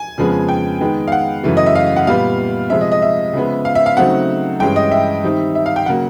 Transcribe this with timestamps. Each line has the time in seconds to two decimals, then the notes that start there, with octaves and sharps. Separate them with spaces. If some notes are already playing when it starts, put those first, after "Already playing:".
Already playing: G#5
0.17 F2 C#3 F3 G#3 B3
0.49 G5
0.81 D#3 G#3 B3 D#4
1.08 F5
1.12 F#5
1.43 F#2 C#3 E3 A3
1.57 D#5
1.66 E5
1.75 F5
1.96 F#5
2.07 A#2 G3 B3 F5
2.70 C3 F3 G#3 E5
2.81 D#5
2.92 D#5
3.02 E5
3.33 C#3 F3 G#3 B3
3.65 F5
3.75 E5
3.86 F5
3.97 C#3 F#3 A3 C4 D#4 F#5
4.60 G2 E3 G#3 C#4 G5
4.76 D#5
4.91 E5
5.24 D#3 G3 C4 D#4
5.55 E5
5.66 F5
5.76 G5
5.86 C#3 F#3 A#3 F#5